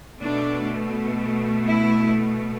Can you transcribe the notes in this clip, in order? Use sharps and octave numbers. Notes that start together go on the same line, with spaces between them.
B2 A3 D4
E4